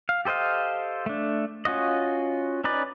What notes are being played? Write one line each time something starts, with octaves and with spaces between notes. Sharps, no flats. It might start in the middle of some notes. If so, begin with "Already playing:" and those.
F5
G4 A4 C5 D#5 F5
A3 D4
C#4 F4 F#4 D#5
C#4 D#4 B4 D5